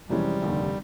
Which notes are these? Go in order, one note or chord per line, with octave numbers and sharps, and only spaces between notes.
F2 C3 E3 G3 G#3 C#4
F1 D#2 D3